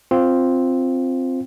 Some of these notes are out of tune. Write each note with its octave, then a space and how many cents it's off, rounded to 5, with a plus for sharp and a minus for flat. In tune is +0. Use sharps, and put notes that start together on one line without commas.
C4 +0 F4 +0